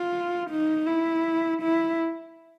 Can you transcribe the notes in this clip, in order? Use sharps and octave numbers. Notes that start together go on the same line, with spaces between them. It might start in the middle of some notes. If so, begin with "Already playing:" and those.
Already playing: F4
D#4
E4
E4